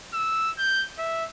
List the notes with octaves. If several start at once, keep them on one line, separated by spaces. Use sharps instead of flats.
E6
G6
E5